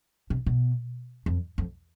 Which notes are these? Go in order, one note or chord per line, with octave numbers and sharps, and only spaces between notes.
C3
B2
F2
F2